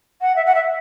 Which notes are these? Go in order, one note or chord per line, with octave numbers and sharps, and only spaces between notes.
F#5
E5
F#5
E5